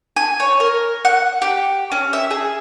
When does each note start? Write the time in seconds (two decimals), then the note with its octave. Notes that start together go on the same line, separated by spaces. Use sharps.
0.16 G#5
0.40 C#5
0.60 A#4
1.05 F#5
1.42 G4
1.92 C#4
2.13 E5
2.31 G#4